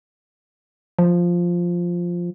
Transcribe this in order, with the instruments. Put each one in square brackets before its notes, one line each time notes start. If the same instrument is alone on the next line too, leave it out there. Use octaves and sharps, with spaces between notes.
[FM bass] F3